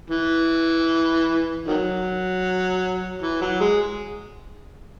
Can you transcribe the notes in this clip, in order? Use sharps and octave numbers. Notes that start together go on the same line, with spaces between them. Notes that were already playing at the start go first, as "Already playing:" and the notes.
E3
D#3 F#3
E3
F#3
G#3